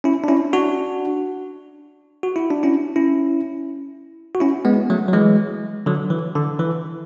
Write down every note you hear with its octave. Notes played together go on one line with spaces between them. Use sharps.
C#4 E4
D4
C#4 E4
D4 F#4
F#4
E4
D4
C#4 E4
C#4 E4
F#4
C#4 E4
G#3 B3
F#3 A3
F#3
E3 G#3
D3 F#3
E3
D3
E3